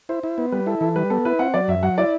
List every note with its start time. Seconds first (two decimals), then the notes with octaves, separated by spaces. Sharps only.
0.09 E4 C5
0.23 E4
0.38 B3
0.52 G3 B4
0.67 E4 A4
0.81 E3 A4
0.96 G3 B4
1.10 B3 A4
1.25 E4 B4
1.39 C4 F#5
1.54 F#3 D5
1.68 F#2 E5
1.83 F#3 F#5
1.98 E4 D5